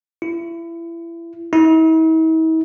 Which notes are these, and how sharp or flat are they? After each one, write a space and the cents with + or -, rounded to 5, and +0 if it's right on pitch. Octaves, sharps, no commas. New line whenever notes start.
E4 +30
E4 -45